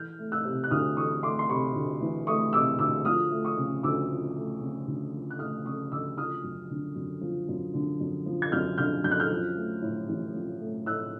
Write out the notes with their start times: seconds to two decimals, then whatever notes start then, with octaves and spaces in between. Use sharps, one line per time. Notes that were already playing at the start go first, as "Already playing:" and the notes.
Already playing: E3 F6 G6
0.19 A3
0.32 E6 F#6
0.45 C3
0.64 F#6
0.71 D2 D#6 F6
0.96 E3 C#6 D#6
1.23 A3 C6 D6
1.39 C6
1.49 C3 B5 C#6
1.76 D2
2.01 E3
2.27 A3 C#6 D#6
2.53 C3 D6 E6
2.79 D2 D6 E6
3.05 F3 D#6 F6
3.31 A3
3.44 C#6 D#6
3.57 C#3
3.83 D2 D6 E6
4.09 F3
4.36 A3
4.61 C#3
4.87 D2
5.13 F3
5.30 F#6
5.39 A3 D#6 F6
5.65 C#3 C#6 D#6
5.92 D2 D6 E6
6.18 F3 D#6 F6
6.44 F#2
6.70 D3
6.96 F#2
7.21 F3
7.48 F#2
7.74 D3
8.00 F#2
8.26 F3
8.42 G#6
8.52 F#2 F6 G6
8.78 D3 F6 G6
9.04 F#2 G6
9.11 F#6
9.20 F6 G6
9.30 F3
9.56 A3
9.82 A2
10.08 A1
10.34 F3
10.60 A3
10.86 A2 E6 F#6